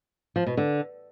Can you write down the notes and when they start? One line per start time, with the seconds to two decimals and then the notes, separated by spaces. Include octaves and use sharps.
0.36 F3
0.47 B2
0.57 D3